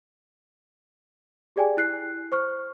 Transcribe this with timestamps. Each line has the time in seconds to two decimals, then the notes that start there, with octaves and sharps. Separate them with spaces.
1.56 G4 G#4 D5 G5 G#5
1.77 E4 F#6 C7
2.32 C5 C#6 F6